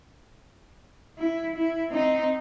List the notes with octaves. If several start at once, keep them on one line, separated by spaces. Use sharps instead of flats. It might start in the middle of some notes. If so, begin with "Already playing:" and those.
E4
E4
C4 D#4